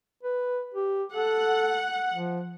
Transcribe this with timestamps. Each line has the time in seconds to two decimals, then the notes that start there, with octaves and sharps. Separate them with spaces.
0.23 B4
0.75 G4
1.14 A4 F#5
2.13 F3